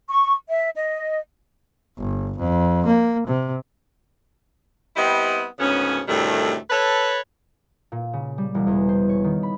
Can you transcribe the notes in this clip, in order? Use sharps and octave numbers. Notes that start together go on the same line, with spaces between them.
C#6
E5
D#5
G1
F2
A#3
C3
G3 B3 C4 E4 D#5
D2 G#2 C#3 B3 C#4
D2 A2 C3 D#3 G3 A3
A4 B4 C#5
A#2
C#3
G3
E1
E2
C5
C#5
D#3
B5